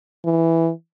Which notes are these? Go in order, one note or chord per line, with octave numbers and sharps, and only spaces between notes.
E3